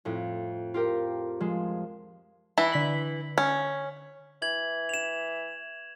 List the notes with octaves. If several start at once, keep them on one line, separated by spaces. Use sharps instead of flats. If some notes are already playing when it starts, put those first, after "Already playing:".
F2 A2
F4 G4 A#4
F3 G#3
E3 E4
D3 B6 F#7
C#4
E3 G#6 F#7
E7 F7